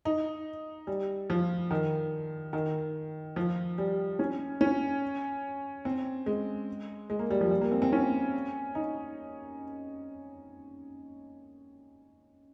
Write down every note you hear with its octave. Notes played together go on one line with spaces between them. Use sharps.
D#4
G3
F3
D#3
D#3
F3
G3
C#4
C#4
C4
G#3
G#3
A#3
G3
F3
G3
A#3
C4
C4
C#4
D#4